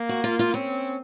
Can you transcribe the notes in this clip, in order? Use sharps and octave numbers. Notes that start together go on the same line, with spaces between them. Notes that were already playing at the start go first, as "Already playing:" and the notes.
Already playing: A#3
F#4
F4
F4
C4 C#4